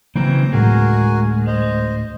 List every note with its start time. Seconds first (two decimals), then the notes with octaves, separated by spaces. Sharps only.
0.16 C#3 E3 F#3 A#3 C4 C#4 A#5 G6
0.52 D2 A2 G#3 F#4 A#4 G#5
1.47 C5 D#5